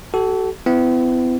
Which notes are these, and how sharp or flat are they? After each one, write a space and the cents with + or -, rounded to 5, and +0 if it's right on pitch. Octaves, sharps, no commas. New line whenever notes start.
F#4 +40 A4 -10
B3 +45 E4 +25